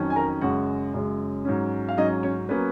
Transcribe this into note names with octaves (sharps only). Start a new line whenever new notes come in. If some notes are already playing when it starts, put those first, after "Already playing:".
Already playing: F2 D#3 F#3 C#4
G#5
A#4 A#5
F#2 C#3 G#3 F#4 F#5
F#2 C#3 G#3
G#2 F#3 C#4
F5
G#2 F#3 C#4 D#4 D#5
C#4 C#5
F#3 A#3 B3 C#4 B4